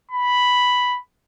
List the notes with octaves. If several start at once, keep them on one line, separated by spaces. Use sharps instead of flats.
B5